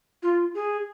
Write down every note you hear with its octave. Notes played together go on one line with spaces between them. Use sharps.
F4
G#4